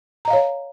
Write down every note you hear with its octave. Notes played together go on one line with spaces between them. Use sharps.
C#5 D#5 F5 A#5